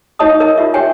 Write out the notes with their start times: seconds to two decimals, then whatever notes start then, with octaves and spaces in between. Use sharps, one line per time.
0.19 D#4 F#4 C#5 D#5 A5 D#6
0.40 A#4 D#5
0.58 F4 G4 E5
0.74 G4 C#5 G5 G#5